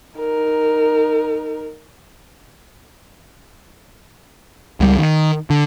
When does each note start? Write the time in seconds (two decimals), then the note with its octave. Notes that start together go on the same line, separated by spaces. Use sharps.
0.18 D#4 A#4
4.80 C#2 G3
4.99 D#3
5.50 D3